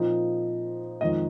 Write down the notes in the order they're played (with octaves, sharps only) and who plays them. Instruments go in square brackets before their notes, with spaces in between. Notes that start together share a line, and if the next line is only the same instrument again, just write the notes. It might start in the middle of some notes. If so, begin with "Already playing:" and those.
Already playing: [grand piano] A#2 F3 C4 D#4
F2 D#3 G#3 D#4 D#5